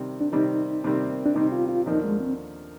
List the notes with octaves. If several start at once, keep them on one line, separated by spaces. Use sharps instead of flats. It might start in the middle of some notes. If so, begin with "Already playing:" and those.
Already playing: C3 D#3 G3 C4
D4
C3 D#3 G3 C4 D#4
C3 D#3 G3 C4
D4
C3 D#3 G3 C4 D#4
F4
F4
D#2 D3 F3 A#3 D4 D#4
G#3
C4